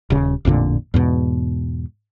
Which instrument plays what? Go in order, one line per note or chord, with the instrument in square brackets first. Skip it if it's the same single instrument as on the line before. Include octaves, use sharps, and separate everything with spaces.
[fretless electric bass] D#1 C#3
A1 F2 A#2 D3
E2 G#2 B2